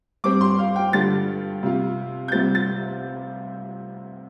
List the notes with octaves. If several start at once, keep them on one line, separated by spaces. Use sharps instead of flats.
G2 G3 C4 D6
C6
F5
G5
G2 D3 G3 F4 A6
C3 G3 F4
G6
C2 C3 G3 C4 F4 A6
A6